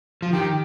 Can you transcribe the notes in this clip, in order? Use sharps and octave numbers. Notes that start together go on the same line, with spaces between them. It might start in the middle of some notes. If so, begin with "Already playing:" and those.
F3
D#3 G4